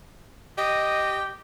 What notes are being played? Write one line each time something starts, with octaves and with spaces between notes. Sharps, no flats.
G4 D#5